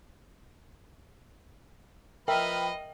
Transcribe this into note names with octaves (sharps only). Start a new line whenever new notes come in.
F3 A#4 B4 D#5 E5 G5 F6